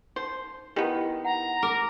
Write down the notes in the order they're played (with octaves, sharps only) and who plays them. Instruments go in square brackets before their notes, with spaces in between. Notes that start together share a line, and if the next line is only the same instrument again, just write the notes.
[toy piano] D#4 [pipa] C5
[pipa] D#3 B3 [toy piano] E4 G4
[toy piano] F#5 [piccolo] A#5
[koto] A#4 [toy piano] D6